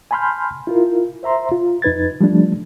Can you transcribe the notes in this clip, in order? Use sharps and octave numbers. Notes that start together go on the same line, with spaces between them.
G#5 A5 B5 C6 F6 G6
E4 F4 A#4
C5 E5 A#5 C6
F4
F2 D#4 B4 G#6 A6
F3 G3 A3 D4